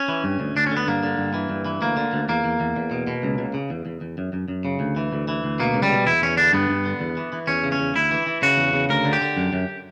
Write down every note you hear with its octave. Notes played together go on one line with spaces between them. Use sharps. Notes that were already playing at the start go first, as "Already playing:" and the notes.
Already playing: C#4
E3
G2
D2
D2 D4
C#4
D3
B3
G2 A#3
D3
G2
E3
G2
E3
D2 A#3
D3
D2
E2 A#3
E2
E2
E2
B2
B2
C#2
C#2
C#3
E2
E2
E2
F#2
F#2
F#2
C#3
D2
E3
D2
E3
D2
B2 A#3
C#2
G3
B2
E2 E4
E2 C#4
D3 D4
G2 B3
G2
D3
E2
E3
E3
E2 C#4
C#3
C#4
E2
D2 E4
E3
E3
C#3 F#4
E2
C#3
D2 A#4
D3
G4
D3
F#2
F#2